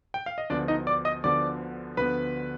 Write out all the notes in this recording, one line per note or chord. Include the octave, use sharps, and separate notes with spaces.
G5
F5
D#5
D2 D3 F3 B3 D4 D5
D#4 D#5
D5 D6
D#5 D#6
D2 D3 F3 B3 D5 D6
D2 D3 F3 B3 B4 B5